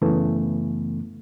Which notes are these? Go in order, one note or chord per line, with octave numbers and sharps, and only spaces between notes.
F#2 C#3 E3 A3 B3